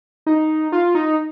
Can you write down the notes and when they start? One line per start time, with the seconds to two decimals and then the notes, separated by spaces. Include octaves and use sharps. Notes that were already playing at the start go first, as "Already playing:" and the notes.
0.26 D#4
0.72 F4
0.95 D#4